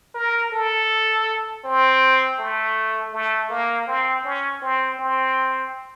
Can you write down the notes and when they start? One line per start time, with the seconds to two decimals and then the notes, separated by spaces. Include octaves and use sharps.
0.15 A#4
0.52 A4
1.64 C4
2.39 A3
3.13 A3
3.50 A#3
3.87 C4
4.24 C#4
4.62 C4
4.99 C4